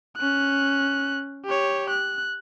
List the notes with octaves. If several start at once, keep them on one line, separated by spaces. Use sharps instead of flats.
C#4 F#6
G4 C#5
F#6